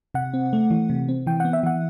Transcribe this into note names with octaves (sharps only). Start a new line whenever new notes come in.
C3 F#5
C4
A3
E3
C3
C4
E3 G5
B3 F#5
E5
E3 F#5